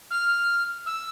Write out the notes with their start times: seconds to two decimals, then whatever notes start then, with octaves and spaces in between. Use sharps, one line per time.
0.11 F6
0.86 E6